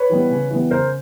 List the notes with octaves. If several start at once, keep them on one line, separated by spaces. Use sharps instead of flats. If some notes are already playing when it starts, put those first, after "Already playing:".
Already playing: B4 C#5
E3 G3 B3
C#3
E3 G3 B3
C#3 A#4 C5